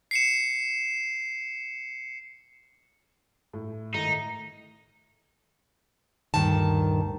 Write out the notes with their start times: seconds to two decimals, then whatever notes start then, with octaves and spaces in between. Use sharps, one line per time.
0.11 C7 C#7 E7
3.53 A2
3.94 A2 D#3 D#4
6.34 D2 G2 A#2 D#3 A5